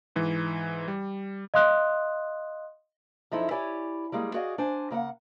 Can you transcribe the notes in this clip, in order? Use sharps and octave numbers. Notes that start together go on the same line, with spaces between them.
G#2 E3
G3
D#5 F5 C6 D#6 F#6
F#2 F3 D#4 E4 A4
E4 G4 C#5 D5 G#5
G3 G#3 A#3 G#4
F#4 G#4 D5 D#5 F5
D4 C5 G#5
C#3 A#3 E5 F#5